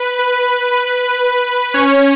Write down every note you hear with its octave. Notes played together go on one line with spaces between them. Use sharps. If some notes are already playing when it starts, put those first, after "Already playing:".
Already playing: B4
B4
B4
C#4 C#5